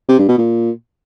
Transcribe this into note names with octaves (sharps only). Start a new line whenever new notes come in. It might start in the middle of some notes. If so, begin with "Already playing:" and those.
C3
G2
B2
A#2